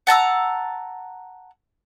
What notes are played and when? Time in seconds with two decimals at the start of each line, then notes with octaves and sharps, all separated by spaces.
0.07 F#5 A5 A#5 E6